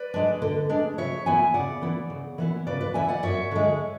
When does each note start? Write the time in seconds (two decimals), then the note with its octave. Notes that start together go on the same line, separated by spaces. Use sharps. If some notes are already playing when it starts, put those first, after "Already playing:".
Already playing: B4 D5
0.14 G#3 D4
0.42 D3
0.69 G#3 D4
0.98 C#3 C#5 E5
1.26 E3 B3 E4 E5 G#5
1.54 C#3 D5 F#5
1.82 E3 B3 E4
2.10 C#3
2.38 E3 B3 E4
2.67 C#3 B4 D5
2.81 B4 D5
2.94 E3 B3 E4 E5 G#5
3.08 D5 F#5
3.23 F#2 C#5 E5
3.51 D3 G#3